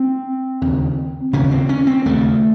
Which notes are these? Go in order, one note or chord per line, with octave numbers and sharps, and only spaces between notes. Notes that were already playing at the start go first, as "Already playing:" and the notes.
Already playing: C4
D#2 C#3
D#2 C#3 C#4
C4
C#4
C4
D#2 C#3 A3